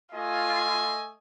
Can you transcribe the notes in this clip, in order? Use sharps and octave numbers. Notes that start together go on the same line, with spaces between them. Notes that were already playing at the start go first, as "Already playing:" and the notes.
A3 F4 D#5 G#5